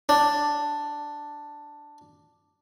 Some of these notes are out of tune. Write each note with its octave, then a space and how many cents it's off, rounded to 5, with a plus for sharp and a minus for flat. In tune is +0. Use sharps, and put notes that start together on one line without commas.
D4 +5